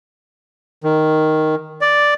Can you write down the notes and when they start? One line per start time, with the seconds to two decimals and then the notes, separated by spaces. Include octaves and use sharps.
0.83 D#3
1.81 D5